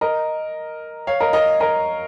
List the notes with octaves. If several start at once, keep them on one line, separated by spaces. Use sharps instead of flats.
A#4 D#5
C#5 F5
A#4 D#5
A#4 D#5
A#4 D#5